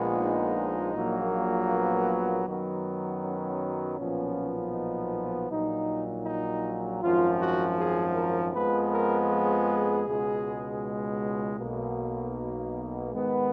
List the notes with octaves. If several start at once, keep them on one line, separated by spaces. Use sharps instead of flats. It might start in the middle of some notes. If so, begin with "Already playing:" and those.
Already playing: A#1 A#2 F3 G#3 B3
D#4
A#1 A#2 F#3 A#3
B3
F#2 D#3 F#3 B3
C#4
B1 A#2 F3 B3 C#4
D#4
A#1 A#2 F#3 D#4
D#4
G#1 F#2 F3 F4
F#4
G#4
A#4
F2 F3 G#3 B3 B4
A#4
G#4
C#2 B2 G#3
B1 B2 A#3
G#2 D#3 G#3 B3